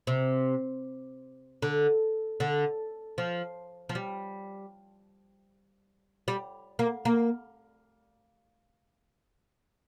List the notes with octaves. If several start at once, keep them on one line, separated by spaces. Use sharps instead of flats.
C3
D3
D3
F3
F3
G3
G3
A#3
A#3